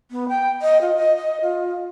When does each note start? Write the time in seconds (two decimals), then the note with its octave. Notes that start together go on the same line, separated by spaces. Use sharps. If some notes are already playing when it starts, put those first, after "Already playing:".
0.11 B3
0.29 G5
0.62 D#5
0.81 F4
0.96 D#5
1.17 D#5
1.42 F4